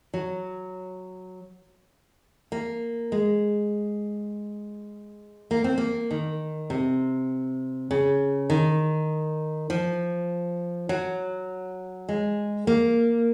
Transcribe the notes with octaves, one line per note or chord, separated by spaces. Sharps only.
F#3
A#3
G#3
A#3
C4
A#3
D#3
C3
C#3
D#3
F3
F#3
G#3
A#3